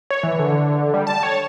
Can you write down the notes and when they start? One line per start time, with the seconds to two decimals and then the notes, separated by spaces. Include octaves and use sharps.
0.10 C#5
0.23 E3
0.39 D3
0.94 G3
1.07 A5
1.23 C#5